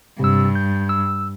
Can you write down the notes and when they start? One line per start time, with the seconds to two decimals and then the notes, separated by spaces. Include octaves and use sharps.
0.20 G2 C3 E6
0.55 G6
0.89 E6